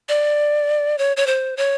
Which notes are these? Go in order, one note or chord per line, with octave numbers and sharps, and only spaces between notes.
D5
C#5
C#5
C5
C#5